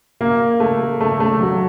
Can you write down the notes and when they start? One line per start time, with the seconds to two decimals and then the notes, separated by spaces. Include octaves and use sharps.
0.21 A#3
0.60 A3
1.01 A3
1.20 A3
1.41 F#3